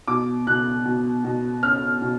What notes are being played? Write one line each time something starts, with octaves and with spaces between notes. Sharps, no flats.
B2 D6
B2 F#6
B2
B2
C#4 F6
B2